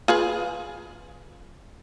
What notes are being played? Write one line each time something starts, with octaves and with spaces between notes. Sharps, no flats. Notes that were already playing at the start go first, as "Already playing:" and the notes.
F4 G#4 B4